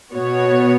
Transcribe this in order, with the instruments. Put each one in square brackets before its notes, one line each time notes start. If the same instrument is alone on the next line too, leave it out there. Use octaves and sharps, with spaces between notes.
[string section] B2 B3 F#4 C#5